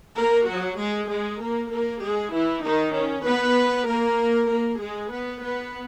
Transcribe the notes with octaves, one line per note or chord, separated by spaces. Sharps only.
A#3 A#4
F#3 F#4
G#3 G#4
G#3 G#4
A#3 A#4
A#3 A#4
G#3 G#4
E3 E4
D#3 D#4
C#4
B3 B4
A#3 A#4
A#3 A#4
G#3 G#4
B3 B4
B3 B4